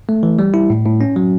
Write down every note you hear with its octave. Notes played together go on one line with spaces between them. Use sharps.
A3
E3
G3
E4
A2
A2
C#4
F#3